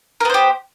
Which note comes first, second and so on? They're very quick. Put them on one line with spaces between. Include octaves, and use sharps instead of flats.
A#4 B3 C5 G4